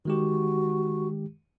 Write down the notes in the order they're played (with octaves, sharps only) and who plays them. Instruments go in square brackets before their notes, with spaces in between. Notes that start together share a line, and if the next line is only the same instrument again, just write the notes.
[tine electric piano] D#3 G#3 G4 [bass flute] F#4